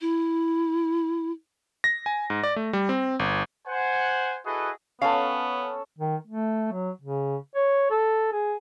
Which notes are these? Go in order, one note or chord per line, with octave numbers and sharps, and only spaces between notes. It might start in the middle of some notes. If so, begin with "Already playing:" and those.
E4
A#6
G#5
G#2
D5
A3
G3
C4
G1
C5 F#5 G#5
E4 F#4 G#4 A4 B4 D#5
B3 C#4 A4 F5
D#3
A3
F#3
C#3
C#5
A4
G#4